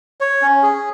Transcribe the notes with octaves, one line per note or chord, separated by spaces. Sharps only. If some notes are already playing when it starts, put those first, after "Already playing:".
C#5
C#4
G#4